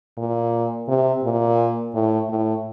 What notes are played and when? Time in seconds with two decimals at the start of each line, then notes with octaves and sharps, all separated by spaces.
0.17 A#2
0.88 C3
1.23 A#2
1.94 A2
2.29 A2